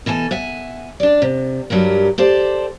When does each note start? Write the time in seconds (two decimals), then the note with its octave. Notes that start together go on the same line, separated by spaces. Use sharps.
0.06 B2 E3 A4 G#5
0.31 E5 F#5 G#5
1.00 D4 D5
1.22 C3
1.70 G2 F#3 G4 A#4
2.18 G4 A4 C5 D5